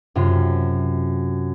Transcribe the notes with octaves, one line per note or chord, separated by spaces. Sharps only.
F#2 C3 F4